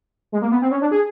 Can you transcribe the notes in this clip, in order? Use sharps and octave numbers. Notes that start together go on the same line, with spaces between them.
G#3
A#3
B3
C4
C#4
D4
G#4